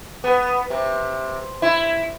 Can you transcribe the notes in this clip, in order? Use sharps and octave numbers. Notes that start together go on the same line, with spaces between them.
B3
C3
E4